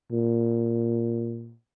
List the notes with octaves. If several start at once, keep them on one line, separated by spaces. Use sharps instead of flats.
A#2